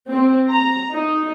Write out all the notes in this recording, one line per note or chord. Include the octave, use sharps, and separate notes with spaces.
C4
A#5
D#4